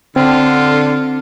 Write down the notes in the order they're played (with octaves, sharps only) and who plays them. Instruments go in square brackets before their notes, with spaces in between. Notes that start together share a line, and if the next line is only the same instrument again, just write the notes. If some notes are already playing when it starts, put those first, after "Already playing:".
[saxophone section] D3 [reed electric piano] C4 [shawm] F4